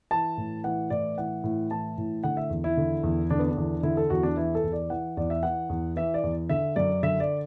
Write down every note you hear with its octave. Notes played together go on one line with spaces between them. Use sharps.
E3 A5
A2
E3 F#5
A2 D5
E3 F#5
A2
E3 A5
A2
D3 F#5
E5
E2
E4
D3
E2
D3 D4
B3
D4
E2
D3 E4
A4
E2 F#4
D4
E3 E4
A4
E2
D5
E3 F#5
E2 D5
E5
E3 F#5
E2
E3 E5
D5
E2
D3 E5
F#2 D5
D3 E5
D5